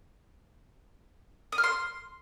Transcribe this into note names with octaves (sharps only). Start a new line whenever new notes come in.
D#6
F6
C6